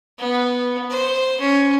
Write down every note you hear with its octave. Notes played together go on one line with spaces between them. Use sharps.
B3
C5
C#4